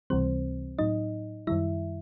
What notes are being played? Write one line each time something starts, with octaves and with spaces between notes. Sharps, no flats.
C#2 C3 E3 G3 C4 C5
A2 F#3 D#4 D#5
F#2 D#3 G3 E4 E5